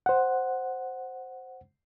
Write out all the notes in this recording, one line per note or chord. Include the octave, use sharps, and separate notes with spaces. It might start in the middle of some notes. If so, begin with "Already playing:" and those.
C5 F#5